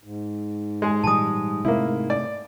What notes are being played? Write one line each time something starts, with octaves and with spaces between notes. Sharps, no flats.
G#2
G#3 G#4
A#2 E3 G3 A5 D#6
C3 A3 A#3 E4
D5